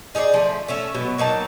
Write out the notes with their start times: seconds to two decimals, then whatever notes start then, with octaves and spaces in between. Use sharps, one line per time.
0.15 D#4 G#4 C#5 D5
0.34 F3 A3
0.68 A3 C#4 E5
0.95 B2 F#3 B3
1.18 F#3 A#3 D#4 A5